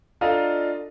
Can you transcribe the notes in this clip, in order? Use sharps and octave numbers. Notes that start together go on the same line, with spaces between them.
D4 F4 A4 D#5 F5 A#5